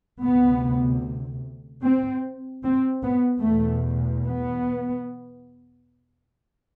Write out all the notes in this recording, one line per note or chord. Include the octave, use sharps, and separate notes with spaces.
D2 C3 B3
C4
C4
B3
E2 B2 A3
B3